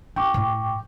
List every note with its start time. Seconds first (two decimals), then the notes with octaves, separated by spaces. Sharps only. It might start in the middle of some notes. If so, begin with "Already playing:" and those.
0.16 C#4 G5 C#6 D6
0.34 A2